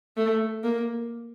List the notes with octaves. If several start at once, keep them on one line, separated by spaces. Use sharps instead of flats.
A3
A#3